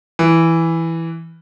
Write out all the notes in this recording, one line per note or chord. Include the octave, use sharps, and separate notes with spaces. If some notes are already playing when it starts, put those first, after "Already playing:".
E3